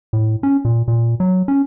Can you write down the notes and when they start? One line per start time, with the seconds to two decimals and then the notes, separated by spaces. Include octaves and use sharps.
0.13 A2
0.43 C#4
0.65 A#2
0.88 A#2
1.20 F#3
1.48 C#4